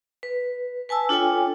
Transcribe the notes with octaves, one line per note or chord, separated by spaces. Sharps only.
B4
B4 G#5 A5 E6
D4 F4 A4 C#5 G5 G#5